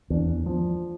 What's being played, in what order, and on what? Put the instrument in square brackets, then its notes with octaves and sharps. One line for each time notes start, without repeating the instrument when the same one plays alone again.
[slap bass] E2 [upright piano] D4
[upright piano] F3